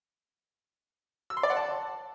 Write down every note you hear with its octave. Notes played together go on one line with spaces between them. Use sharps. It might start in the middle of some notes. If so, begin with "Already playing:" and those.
E6
C6
D5
F#5
A5